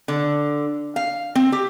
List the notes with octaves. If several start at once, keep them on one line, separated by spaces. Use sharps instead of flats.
D3
F5
C4
G4